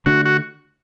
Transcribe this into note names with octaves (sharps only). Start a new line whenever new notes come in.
D3 A3 D4 F#4
F#4